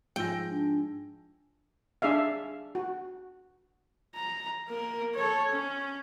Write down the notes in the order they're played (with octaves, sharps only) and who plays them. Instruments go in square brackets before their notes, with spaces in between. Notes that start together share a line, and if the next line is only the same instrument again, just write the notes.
[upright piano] G#2 G#4 G#5 [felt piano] F3 E6 A#6 [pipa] G5
[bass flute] D4
[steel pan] D4 G#4 E5 F5
F#4
[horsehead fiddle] A#5
A#3 A#4
A4 C#5
C#4